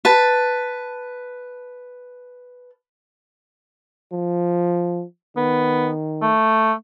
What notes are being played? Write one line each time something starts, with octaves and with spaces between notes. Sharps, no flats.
B4 A5
F3
D#3 B3
A3